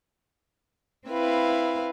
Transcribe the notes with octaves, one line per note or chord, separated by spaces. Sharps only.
C4 E4 B4 F5